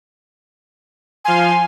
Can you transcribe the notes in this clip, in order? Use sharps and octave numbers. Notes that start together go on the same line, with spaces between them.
F3 F5 G#5 C6